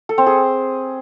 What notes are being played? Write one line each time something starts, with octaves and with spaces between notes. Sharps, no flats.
A4
C4
G#4